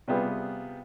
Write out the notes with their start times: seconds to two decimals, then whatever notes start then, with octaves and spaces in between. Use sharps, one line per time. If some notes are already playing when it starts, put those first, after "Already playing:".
0.08 C3 G3 B3 F4 G#4